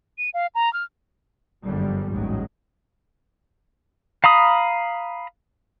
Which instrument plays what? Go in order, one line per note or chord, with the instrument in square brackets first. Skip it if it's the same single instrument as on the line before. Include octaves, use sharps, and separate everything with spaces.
[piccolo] D#7
F5
A#5
F6
[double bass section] G1 F#2 D3 F3 G3 G#3
A1 D#2 G#2 F#3 G#3
[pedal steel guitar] F5 A#5 B5 D#6